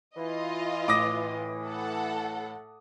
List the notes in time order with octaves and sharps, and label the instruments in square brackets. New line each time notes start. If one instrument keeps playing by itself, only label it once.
[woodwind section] E3 [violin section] F4 D#5
[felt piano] A2 [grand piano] D6 D#6 A#6
[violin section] A4 F#5